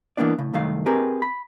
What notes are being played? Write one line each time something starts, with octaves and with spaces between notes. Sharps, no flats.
E3 A#3 B3 D4 D5
A2 C#3
C2 F#2 D#3 A3 F5
C4 G4 G#4 A#4 B4
B5